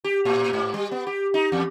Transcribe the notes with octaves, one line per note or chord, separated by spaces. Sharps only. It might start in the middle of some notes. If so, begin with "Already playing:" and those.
G4
A2
G#2
G3
B3
G4
D#4
E2